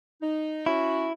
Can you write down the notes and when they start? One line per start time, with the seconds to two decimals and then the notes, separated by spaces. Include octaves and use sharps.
0.22 D#4
0.66 C#4 E4 F#4